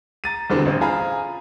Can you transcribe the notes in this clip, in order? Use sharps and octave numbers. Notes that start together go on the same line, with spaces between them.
A#5 A6 D#7
E2 B2 D3 G3 C4 D4
A1 C4
F4 G#4 G#5 A#5 B5